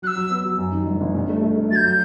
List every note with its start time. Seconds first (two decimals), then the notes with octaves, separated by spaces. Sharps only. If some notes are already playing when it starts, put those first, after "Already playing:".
0.02 F#3 F#6
0.06 E6
0.16 F#3
0.30 B3
0.44 F#3
0.58 F#2
0.73 D#3
0.87 G1
1.01 G1
1.15 G2
1.29 A3
1.43 A3
1.56 A3
1.71 F#3 A6
1.75 G6
1.84 F#3